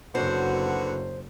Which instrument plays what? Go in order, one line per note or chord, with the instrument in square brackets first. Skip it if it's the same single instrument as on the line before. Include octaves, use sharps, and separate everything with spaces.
[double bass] F#1 [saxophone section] D3 B3 F#4 [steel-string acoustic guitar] C5